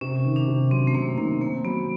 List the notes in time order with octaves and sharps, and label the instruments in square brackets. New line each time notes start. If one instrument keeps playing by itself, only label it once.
[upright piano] C3 [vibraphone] C#4
[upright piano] D#3
[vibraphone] D4
[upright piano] C3
[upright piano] F#3 [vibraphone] C4
[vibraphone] A3
[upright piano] C3 [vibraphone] A#3
[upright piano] D#3 [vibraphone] A#3
[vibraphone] A#3 [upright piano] C4
[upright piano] F#3 [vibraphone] B3